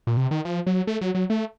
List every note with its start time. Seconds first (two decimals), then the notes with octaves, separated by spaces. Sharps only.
0.07 A#2
0.17 C3
0.31 D#3
0.45 F3
0.67 F#3
0.87 A3
1.01 F#3
1.15 F#3
1.30 A3